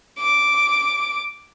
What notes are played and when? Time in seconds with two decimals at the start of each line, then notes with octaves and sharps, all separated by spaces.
0.20 D6